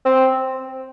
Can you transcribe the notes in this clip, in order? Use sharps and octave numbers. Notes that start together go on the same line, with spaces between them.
C4